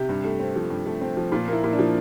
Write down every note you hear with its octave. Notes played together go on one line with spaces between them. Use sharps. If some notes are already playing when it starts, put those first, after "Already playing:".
Already playing: C3 G4
G2
A3
C4
F3
G2
A3
C4
F3
A#2 F4
A#3 E4
A#2
D4
F3